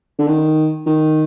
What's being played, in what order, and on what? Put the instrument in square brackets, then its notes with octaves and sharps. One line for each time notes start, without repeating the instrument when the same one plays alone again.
[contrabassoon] D3
D#3
D#3